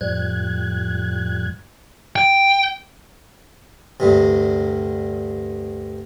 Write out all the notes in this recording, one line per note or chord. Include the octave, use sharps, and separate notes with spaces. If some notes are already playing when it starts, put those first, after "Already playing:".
F2 A2 F3 G3 F#6 G#6
G5
D2 G2 C3